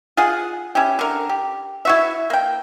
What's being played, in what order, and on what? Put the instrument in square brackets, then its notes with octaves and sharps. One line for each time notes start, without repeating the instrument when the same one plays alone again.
[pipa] F4 G#4 F#5
C#4 E4 G4
D3 A#4
G4
E4 F#4 E5
A#3 G5